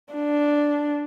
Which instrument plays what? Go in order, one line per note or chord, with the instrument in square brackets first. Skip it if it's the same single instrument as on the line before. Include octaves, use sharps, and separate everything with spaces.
[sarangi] D4